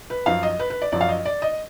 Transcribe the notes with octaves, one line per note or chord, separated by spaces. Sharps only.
B4
F#2 F3 F5
D#5
B4
B4
D5
F#2 F3 D5
F5
D#5
D5
D#5